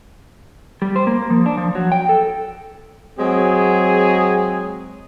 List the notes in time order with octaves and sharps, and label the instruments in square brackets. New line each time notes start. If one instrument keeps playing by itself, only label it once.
[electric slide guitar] G3
C5
A#3
F3
D4
F3
F#3
G5
A4
[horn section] F#3 G#3 C4 G#4